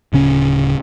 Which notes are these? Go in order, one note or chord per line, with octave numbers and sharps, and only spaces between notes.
D1 C#3 C#4